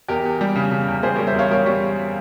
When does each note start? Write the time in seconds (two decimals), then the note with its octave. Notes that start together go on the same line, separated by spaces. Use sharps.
0.08 E2 G4 A#4
0.25 E2
0.41 G3
0.56 C#3
0.72 C#3
0.88 E2
1.03 G3 G#4 C5
1.15 A#4 C#5
1.19 G3
1.27 C5 E5
1.35 E2 C#5 F5
1.51 G3 A#4 C#5
1.66 G3 C#5